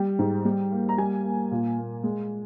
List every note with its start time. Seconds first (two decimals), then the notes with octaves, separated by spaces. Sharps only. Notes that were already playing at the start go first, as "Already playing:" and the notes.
Already playing: G3 G5
0.19 G#2
0.45 G3
0.72 A#3
0.89 A#5
0.98 G3 G#5
1.24 A#3
1.51 A#2
1.78 A#3
2.03 G#3